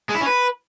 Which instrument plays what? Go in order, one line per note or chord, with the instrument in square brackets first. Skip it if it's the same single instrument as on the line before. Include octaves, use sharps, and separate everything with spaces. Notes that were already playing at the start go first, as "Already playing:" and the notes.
[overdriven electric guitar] G#3
E4
C#4
B4